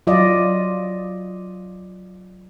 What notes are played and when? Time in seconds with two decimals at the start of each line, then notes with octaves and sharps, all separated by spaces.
0.07 F#3 F4 D5 D#5